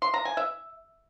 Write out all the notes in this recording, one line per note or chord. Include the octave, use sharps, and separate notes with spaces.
C6
A#5
G#5
E5